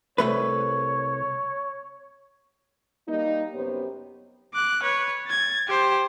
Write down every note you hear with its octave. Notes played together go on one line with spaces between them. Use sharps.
C2 A3 B4 C#5
G3 A#3 D#4
F#2 C3 B3 G4 C5 C#5
D6 F#6
B4 C#5
G#6 A6
G4 C5